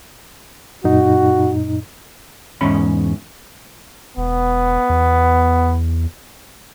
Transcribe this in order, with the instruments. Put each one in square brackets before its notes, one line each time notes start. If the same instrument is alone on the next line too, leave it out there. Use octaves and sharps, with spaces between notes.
[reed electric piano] F#2 A#2 D#4 [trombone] F#4
[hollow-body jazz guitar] E2 G#2 C#4 B5
[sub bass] E1 [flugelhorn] B3
[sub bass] E2